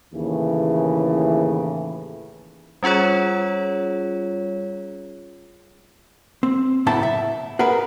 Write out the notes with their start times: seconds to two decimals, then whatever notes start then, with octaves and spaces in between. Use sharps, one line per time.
0.14 D#2 A2 C#3 E3
2.83 G3 C#4 F4 G#4 C#5
6.43 C4
6.86 A2 C#3 F#3 B3 E4 A5
7.03 E5
7.59 F#4 G#4 A#4 B4